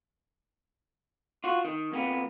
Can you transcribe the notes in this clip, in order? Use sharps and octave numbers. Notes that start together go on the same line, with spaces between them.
F4 F#4
D#3
F2 A#3 B3